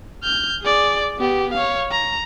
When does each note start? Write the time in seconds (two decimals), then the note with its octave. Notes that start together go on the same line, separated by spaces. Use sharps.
0.23 F6 G6
0.62 G#4 D5
1.19 B3 G4
1.53 C#5 F5
1.91 A#5